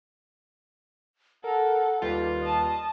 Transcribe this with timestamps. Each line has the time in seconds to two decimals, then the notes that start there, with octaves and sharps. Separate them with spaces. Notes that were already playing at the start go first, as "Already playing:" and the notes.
1.44 A4 A#4 F#5
2.02 D#2 G3 F4 B4
2.41 D#5 A5